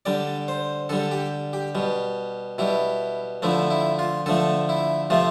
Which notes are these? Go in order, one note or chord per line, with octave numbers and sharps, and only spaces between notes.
D3 G3 D5
C5
D3 G3 A4
G4
G4
B2 G3
B2 G3 E4
D3 F3 A3 E4
E4
F4
D3 F3 A3 A4
E4
C3 F3 A3 F4